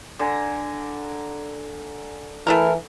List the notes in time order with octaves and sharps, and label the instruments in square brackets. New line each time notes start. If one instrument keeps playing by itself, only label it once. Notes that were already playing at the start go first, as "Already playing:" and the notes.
[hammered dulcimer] D3 G#5 A#5
[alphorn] E3 [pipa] A3 E4 A#4